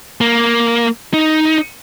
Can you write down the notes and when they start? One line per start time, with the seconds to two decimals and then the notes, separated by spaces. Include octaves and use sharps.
0.21 A#3
1.14 D#4